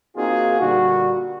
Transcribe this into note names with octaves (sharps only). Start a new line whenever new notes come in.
A#3 C4 D#4 F4 F#4 G#4
A#2 D3 G3 F#4